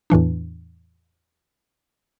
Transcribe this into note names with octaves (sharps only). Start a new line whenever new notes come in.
E2 A2 E3 D4